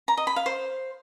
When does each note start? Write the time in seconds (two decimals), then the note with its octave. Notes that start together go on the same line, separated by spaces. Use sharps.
0.08 A#5
0.17 D#5
0.27 B5
0.36 F5
0.46 C5